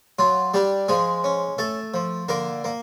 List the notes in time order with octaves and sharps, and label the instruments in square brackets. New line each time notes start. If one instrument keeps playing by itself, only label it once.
[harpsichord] F#3 F4
G3 D4 G4
F3 G#3 G#4
C#4
A3 A4
F3
D3 A#3 A#4
A#3